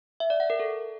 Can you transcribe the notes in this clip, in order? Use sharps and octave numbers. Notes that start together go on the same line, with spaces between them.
E5
D5
F#5
A#4
A4